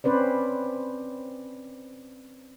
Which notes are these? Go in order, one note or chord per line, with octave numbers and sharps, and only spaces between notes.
C4 C#4 B4 C5 D5